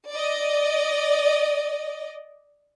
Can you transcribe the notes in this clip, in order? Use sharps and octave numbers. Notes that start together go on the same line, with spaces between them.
D5 D#5